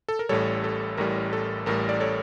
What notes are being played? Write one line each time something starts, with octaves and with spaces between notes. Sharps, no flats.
A4
A#4
A1 A2 G3 A4 C#5
A4
A1 A2 G3 A#4
A4
A1 A2 G3 A#4
D5
A4 C#5